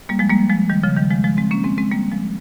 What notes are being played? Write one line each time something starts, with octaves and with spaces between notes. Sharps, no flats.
G3 A#3
F3 G#3
G3 A#3
F3 G#3
D#3 G3
C#3 F3
D#3 G3
F3 G#3
F3 G#3
G#3 C4
A#3 C#4
G#3 C4
G#3 C4
G3 A#3
F3 G#3